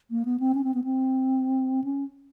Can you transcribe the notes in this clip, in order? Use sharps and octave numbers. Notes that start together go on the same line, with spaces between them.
A#3
B3
C4
C#4
C4
B3
C4
C#4